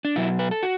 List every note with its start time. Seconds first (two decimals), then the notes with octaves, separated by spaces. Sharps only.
0.05 D4
0.16 B2 F#3 E4
0.39 B4
0.51 A4
0.63 F#4